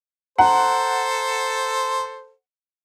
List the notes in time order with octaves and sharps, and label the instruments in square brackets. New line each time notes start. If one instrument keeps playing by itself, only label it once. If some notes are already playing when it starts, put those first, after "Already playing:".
[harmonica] A4 C5 [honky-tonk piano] F#5 [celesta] A#5